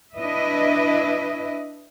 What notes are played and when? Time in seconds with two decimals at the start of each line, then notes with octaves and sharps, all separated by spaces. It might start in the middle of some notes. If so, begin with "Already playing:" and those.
0.16 D4 E4 B4 D#5 E5